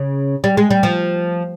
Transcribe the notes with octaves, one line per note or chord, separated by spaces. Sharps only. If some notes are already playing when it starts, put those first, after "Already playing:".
Already playing: C#3
G3
G#3
G3
F3